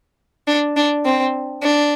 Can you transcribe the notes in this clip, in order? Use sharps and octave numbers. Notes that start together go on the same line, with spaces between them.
D4
D4
C4
D4